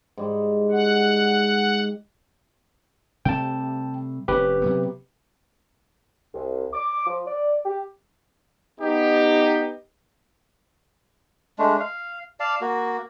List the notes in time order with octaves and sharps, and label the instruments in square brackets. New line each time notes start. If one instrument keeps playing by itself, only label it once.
[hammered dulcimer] G#2 G3
[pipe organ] F#5
[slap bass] C3 G3 A3 [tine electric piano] G5 A5
[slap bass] F1 C4 C#4 [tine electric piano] G4 B4
[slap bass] C3 F#3 B3
[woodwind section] C2
D6
F3
D5
G4
[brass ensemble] B3 D#4 G4
[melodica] G#3 A3 D4
F5
D5 F5 A5
A#3 F#4